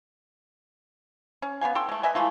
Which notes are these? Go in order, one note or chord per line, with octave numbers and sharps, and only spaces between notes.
C#4
B3 D#4 F5 G#5
A4 G5 C6
G#3 A3
B4 D#5 E5 G#5
E3 G#3 A3 F4